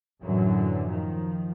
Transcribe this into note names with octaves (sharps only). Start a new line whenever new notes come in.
F#2 A2 D3 E3 F#3
D#3 F3